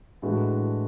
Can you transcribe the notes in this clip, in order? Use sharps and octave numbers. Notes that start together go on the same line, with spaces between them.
A2 E3 G#3 D4 F#4